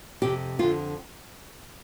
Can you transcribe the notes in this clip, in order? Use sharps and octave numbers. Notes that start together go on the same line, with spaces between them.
F2 C3 G4
F2 D3 F4